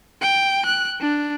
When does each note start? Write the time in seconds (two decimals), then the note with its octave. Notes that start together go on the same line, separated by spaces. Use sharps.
0.21 G5
0.66 F#6
1.01 D4